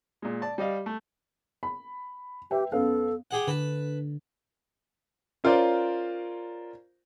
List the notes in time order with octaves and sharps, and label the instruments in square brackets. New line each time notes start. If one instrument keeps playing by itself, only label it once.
[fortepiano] A#2 G#3
D5 A5
G3 D5 D#5 F5
A3
[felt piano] B5
[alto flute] G4 [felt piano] B4 E5 G5
[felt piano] F#2 B3 F5 [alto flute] A4
[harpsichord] G4 G#4 F#5
[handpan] D3 [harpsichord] B4 A5
[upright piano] C#4 F4 A#4 C5 D5